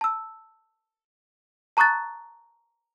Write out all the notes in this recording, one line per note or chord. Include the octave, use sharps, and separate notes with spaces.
A5 E6
A5 A#5 C#6 D#6 F#6 A6